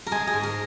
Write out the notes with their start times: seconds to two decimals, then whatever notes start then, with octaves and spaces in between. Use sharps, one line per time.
0.07 A#4
0.12 G#3 G#4
0.27 G#4
0.33 G#2
0.43 A#4